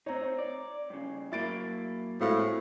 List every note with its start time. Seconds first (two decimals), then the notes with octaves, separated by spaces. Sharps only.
0.06 C4 D#4 C#5 A#5
0.39 D5
0.90 G2 C#3
1.32 F#3 A#3 E4 A6 D7
2.21 A2 G#3 A3 C4 F#4 F5